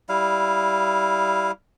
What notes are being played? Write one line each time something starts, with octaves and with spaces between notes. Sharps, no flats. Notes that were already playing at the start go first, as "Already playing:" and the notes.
G3 E4 F5